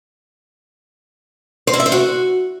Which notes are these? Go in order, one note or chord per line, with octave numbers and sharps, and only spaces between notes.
C5
E4
E5
C5
F#4